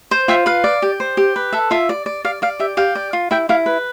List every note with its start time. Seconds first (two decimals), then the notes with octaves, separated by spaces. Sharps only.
0.11 C5
0.28 F4 E5 G5
0.46 B4 F5
0.64 D5
0.82 G4
1.00 C5
1.17 G4
1.36 B4
1.53 A4 E5
1.71 F4 E5
1.89 D5
2.06 D5
2.25 D5 F5
2.42 D5 F5
2.59 G4 E5
2.77 G4 F5
2.95 D5
3.13 F4
3.31 E4 E5 G5
3.49 E4 F5
3.66 B4